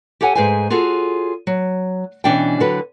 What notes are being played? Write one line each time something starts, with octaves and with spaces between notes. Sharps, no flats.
G4 A4 C#5 F#5 G#5
G#2 G#4 B4 C5 F5 G#5
F4 F#4 G#4 A4 C#5
F#3
B2 E3 C#4 D4 D5 G5
D3 F#3 F#4 A4 B4